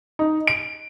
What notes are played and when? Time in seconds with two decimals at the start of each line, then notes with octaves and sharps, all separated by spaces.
0.19 D#4
0.47 D7